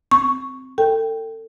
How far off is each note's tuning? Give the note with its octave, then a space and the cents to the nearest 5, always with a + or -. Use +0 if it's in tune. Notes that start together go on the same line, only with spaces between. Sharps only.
C4 -15 C#6 +0
A4 +30 G5 +0